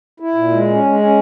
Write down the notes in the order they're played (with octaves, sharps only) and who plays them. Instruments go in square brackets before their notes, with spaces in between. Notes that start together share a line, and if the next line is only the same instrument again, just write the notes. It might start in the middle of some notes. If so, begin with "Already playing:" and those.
[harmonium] E4
A#2
G#3
C#4
G#3
C#4